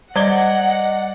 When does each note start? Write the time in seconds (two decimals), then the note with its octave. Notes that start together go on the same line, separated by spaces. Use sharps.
0.16 G3 D5 D#5 F#5 G#6 G7